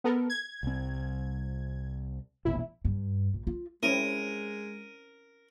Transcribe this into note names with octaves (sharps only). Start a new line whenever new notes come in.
B3 A4 A#4
G#6
C2 C4
E1 A#1 E2 E4
G2
A#1
F4
G#3 C4 C#4 E4 A#4 D#7